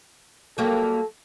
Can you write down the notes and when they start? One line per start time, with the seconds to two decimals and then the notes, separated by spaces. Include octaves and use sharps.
0.58 F#3 G3 A#3 A4